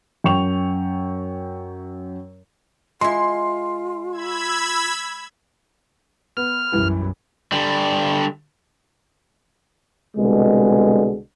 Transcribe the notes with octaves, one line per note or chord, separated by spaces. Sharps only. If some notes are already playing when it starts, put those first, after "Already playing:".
F#2 G5 C#6 F7
G#3 E4 F4 C6
B5 E6 G#6
B3 F6
B1 F#2 E3 G3 E4
D3 G3
C2 B2 D3 G#3